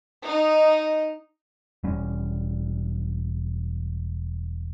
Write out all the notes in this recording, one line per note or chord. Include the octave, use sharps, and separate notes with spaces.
D#4
E1 G3 C#4